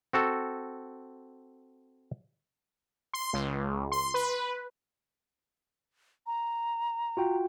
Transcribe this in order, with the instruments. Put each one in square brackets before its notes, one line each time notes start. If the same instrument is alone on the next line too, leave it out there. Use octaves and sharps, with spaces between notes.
[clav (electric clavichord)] C4 F#4 A4
[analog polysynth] C6
C#2
C6
B4
[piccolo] A#5
[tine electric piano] F4 F#4 G5